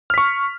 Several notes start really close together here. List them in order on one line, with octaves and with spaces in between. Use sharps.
F6 B6 C#6